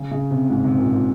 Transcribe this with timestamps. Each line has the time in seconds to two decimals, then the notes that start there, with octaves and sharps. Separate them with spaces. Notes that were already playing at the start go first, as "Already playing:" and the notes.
Already playing: C#3
0.11 C#3
0.31 C3
0.50 G#2
0.64 C3
0.78 A#2
0.92 A#2